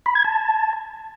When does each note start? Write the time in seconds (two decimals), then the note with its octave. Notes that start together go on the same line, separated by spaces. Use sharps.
0.06 B5
0.15 G#6
0.24 A5